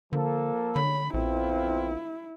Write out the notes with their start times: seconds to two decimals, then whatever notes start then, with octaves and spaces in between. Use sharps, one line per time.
0.13 D3 F3 A#3 A4
0.76 D3 C#5 B5
1.14 A#1 F2 B3 C4 E4 F4